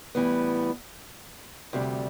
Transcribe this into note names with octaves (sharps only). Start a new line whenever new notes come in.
A2 E3 G3 B3
D2 C3 G3